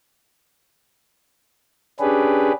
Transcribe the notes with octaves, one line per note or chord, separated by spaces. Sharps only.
C#4 D4 G4 G#4 B4